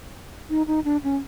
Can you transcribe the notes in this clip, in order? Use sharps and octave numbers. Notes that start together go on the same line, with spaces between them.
D#4
D#4
D4
C#4